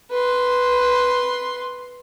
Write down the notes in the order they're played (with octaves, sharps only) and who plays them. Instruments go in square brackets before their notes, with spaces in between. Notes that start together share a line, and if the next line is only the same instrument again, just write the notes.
[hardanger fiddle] B4 C6